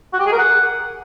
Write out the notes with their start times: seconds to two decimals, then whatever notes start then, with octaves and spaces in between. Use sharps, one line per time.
0.13 F#4
0.20 G4
0.26 G#4
0.32 A#4
0.38 F#5